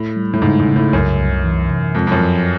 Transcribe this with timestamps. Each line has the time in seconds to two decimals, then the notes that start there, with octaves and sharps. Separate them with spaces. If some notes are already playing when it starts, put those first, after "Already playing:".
Already playing: A2
0.16 G3
0.33 A2
0.42 G#2 C#3
0.59 G#2
0.68 C#3
0.76 A2
0.93 C2 F#2
1.19 C2
1.44 E3
1.69 C3
1.95 F2 G#3
2.07 F2
2.12 F#2
2.20 F3